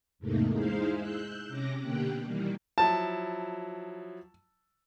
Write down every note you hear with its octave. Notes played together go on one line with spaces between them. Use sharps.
E2 G#2 C3 A3 A#3 D#4
G#3 D#4 E4 G#4 C5 F5
E6 F#6 G6
C3 C#4 D6 A#6
B2 D3 A#3 G4 G5 F#6
D#3 E3 G3 A#3
F3 F#3 E4 A5